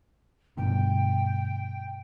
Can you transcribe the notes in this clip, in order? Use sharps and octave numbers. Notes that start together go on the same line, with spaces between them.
G2 B2 D3 G5